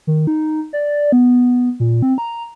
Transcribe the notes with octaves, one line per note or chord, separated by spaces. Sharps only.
D#3
D#4
D5
B3
A#2
C4
A#5